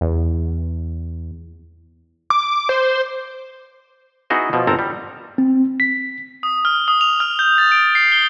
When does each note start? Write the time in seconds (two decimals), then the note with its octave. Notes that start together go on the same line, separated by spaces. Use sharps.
0.01 E2
2.30 D6
2.69 C5
4.30 B3 D#4 E4 F#4 G#4 D#5
4.53 B2 F3
4.67 G1 C4 A4 A#4 A#5
4.79 G3
5.38 C4
5.80 B6
6.43 D#6
6.65 F6
6.88 D#6
7.01 F7
7.20 F6
7.39 G6
7.58 A6
7.72 D7
7.95 C7
8.12 G7